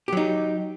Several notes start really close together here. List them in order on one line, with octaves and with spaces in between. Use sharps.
G4 F#3 D#4